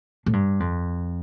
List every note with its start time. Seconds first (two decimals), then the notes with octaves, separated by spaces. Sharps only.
0.26 A2
0.33 G2
0.60 F2